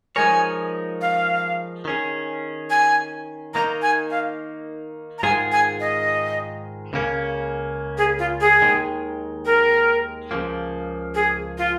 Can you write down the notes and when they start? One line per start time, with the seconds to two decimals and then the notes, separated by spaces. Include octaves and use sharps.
0.16 F3 G#3 D#4 A#4 C#5 G#5
1.01 F5
1.85 D#3 C#4 G#4
2.70 G#5
3.54 D#3 A#3 D#4 A#5
3.82 G#5
4.11 F5
5.18 A#5
5.23 G#2 D#3 G#3 F4 G#4 G#5
5.52 G#5
5.80 D#5
6.93 C#2 C#3 A#3 C#4
7.98 G#4
8.19 F4
8.41 G#4
8.62 D#2 D#3 G#3
9.46 A#4
10.31 C#2 C#3 F3 A#3
11.15 G#4
11.58 F4